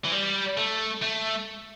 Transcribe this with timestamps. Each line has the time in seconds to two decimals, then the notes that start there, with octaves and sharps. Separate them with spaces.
0.05 E3
0.12 G3
0.58 A3
1.02 A3